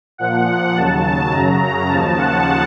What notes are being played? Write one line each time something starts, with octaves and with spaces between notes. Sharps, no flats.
A#2 F3 F#5
D#2 C#3 F#3 A5
F#2 C#3 F#3 A#5
D#2 C#3 F3 A5
F#5